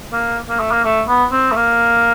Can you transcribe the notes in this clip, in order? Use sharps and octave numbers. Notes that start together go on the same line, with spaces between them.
A#3
A#3
A3
A#3
A3
B3
C4
A3
A#3